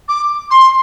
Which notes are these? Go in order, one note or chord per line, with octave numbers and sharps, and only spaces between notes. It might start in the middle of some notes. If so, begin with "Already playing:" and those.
D6
C6